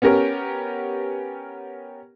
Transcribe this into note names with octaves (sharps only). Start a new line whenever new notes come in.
B3 C#4 G4 A#4